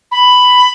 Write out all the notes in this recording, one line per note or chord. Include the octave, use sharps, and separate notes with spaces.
B5